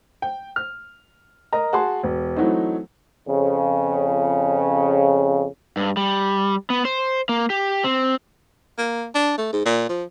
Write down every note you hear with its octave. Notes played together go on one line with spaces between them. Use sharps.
G5
F6
A#4 D#5 A#5
F#4 G#4 A5 C6
E1
E3 F#3 A3 C4 D#4
F2 C#3
G2
G3
B3
C5
A#3
G4
C4
A#3
D4
A3
G#2
A#2
F3